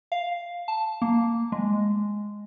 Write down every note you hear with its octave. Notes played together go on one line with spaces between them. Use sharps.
F5
A5
A#3
G#3